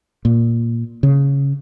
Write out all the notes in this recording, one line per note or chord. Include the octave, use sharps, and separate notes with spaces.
A#2
C#3